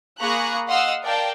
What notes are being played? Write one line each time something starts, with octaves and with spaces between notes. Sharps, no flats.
A#3 G#4 A#5 B5 C#6 F#6
D#5 F5 F#5 C6 E6 F6
A#4 D5 F5 G5 A5